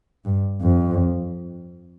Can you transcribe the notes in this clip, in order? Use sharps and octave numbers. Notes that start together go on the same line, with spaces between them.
G2
F2